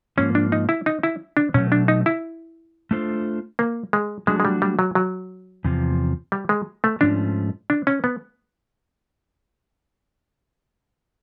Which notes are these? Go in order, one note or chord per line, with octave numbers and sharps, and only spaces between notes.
G#2 F3 A#3 C#4
D4
D#4
E4
D#4
E4
D4
B2 F#3 A3 C#4
D4
D#4
E4
A3 D4 F4 A4 C5
A#3
G#3
F#3 G#3 A3 D4 F#4
G#3
G3
G3
F#3
F#3
E2 C3 F3
G3
G#3
A3
G#2 F3 A3 C#4 D4
D4
C#4
B3